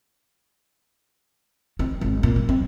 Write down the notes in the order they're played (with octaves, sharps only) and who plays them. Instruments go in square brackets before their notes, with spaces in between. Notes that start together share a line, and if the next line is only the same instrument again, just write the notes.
[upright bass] C4
G#1
A#2
G3
C4